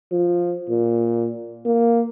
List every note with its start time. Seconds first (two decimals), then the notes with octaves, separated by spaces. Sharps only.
0.12 F3
0.69 A#2
1.66 A#3